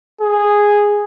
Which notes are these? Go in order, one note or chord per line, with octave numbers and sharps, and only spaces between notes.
G#4